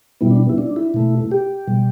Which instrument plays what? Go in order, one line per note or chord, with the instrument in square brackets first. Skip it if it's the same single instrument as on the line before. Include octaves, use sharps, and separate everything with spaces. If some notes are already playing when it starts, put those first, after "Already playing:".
[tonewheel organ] B2 G3 B3 E4
D4
E4
D4
E4
B2 A3
G4
B2 G3